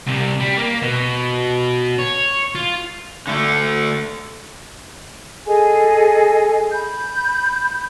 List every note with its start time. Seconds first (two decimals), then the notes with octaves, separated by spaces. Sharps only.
0.07 C2 C3
0.41 G3
0.59 A#3
0.82 B2
1.99 C#5
2.55 F4
3.27 D3 A3
5.46 G#4 A4 D#5 G#5
6.71 B5 G6